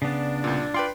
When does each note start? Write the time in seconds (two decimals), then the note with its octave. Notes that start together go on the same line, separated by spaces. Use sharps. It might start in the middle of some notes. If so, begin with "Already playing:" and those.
0.02 C#3 B3 D4
0.44 C2 A#2
0.74 F4 B4 D5 G5 C6